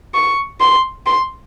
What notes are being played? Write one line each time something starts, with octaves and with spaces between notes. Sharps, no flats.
C#6
C6
C6